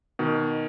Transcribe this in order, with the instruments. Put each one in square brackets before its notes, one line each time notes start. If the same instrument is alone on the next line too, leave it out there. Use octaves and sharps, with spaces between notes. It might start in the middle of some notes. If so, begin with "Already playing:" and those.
[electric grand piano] B2 D#3